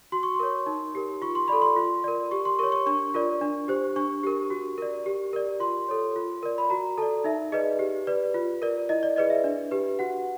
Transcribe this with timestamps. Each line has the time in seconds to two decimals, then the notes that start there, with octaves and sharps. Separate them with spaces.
0.12 F#4 C6
0.23 C#6
0.34 C6
0.40 A#4 C#5
0.66 D#4
0.95 G4 A#4
1.22 F4 C#6
1.35 C6
1.48 A4 D5 B5
1.62 C6
1.76 F4
2.04 A#4 D5
2.31 G4 C#6
2.45 C6
2.59 A#4 C#5 C#6
2.72 C#6
2.86 D4 C#6
3.14 F4 A#4 D5
3.41 D4
3.68 G4 C5
3.96 D4 C#6
4.24 G4 A#4
4.50 F#4
4.78 A#4 D5
5.06 G4
5.33 A#4 D5
5.60 F4 C6
5.88 A4 C#5
6.16 F4
6.43 A#4 D5
6.58 B5
6.70 F#4 A#5
6.97 A4 D5 A5
7.24 D#4 E5
7.52 G#4 B4 D5 D#5
7.79 G4
8.07 B4 D5
8.34 F4
8.62 A#4 D5
8.89 E4 D#5
9.03 D5
9.16 G#4 B4 D5 D#5
9.30 E5
9.44 D4
9.71 G4 B4
9.99 F#4 F#5